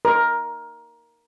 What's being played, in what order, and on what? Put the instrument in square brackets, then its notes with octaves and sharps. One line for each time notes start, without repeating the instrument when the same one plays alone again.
[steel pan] A#4